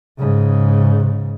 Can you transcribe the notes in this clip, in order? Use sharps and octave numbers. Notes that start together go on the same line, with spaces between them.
G#2 C#3